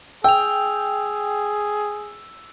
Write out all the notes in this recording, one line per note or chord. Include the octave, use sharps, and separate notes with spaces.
G#4 G5 E6 F7